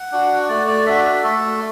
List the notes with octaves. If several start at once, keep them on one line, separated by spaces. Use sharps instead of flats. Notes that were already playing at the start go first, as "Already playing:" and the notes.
Already playing: F#5
D4 F#4
A3 D5
D5
D4 F#4 E5
E5
A3 A4